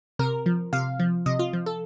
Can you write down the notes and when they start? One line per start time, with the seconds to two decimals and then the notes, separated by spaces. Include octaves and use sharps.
0.19 C3 A#4
0.46 F3
0.73 C3 F5
0.99 F3
1.26 C3 D#5
1.39 F4
1.53 F3
1.66 A4